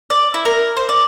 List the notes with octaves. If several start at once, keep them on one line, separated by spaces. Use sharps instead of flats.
D5
E4
A#4
C5
D5